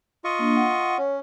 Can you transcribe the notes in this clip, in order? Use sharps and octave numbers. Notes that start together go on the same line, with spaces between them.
F4 D#5 C#6
A#3 D4
F#5
C#4 C#5